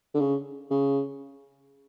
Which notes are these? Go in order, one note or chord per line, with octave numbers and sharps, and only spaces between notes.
D3
C#3
C#3